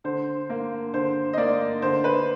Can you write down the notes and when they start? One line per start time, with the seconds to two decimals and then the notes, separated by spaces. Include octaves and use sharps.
0.04 D3 C5
0.50 A#3
0.94 D3 C5
1.33 D#5
1.37 A#3 D5
1.82 D3 C5
2.04 B4